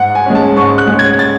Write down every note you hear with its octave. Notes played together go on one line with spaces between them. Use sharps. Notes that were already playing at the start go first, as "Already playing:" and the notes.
Already playing: G#2 F#5
G#5
G#3 C#4
A5
G#2 C#6
F#6
G#3 C#4
G#6
A6